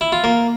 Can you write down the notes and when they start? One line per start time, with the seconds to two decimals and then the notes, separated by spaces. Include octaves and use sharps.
0.01 E4
0.12 F4
0.24 A#3